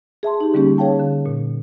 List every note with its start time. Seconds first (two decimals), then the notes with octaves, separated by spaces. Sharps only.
0.23 G#4 E5 A5 C6
0.41 D#4 G4
0.54 D3 G3 A#3 C#4 G4
0.78 G#4 C#5 F5 G5 A5
1.00 D3
1.26 A#2